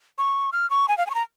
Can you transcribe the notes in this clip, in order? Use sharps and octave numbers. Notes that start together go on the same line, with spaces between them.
C#6
F6
C#6
G#5
F5
G#5
C#6
A#5